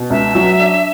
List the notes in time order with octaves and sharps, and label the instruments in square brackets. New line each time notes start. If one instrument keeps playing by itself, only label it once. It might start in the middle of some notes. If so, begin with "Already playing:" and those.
Already playing: [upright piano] B2
[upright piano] C#2 [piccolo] E5
[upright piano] F#3
D4